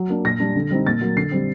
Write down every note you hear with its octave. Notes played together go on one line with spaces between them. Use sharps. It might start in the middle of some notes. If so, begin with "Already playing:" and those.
Already playing: F#3
A#3 D4
A#2 A#6
G3 D4
D3
G3 C4 D#4
A#2 A6
F#3 A#3
D3 C7
G3 C4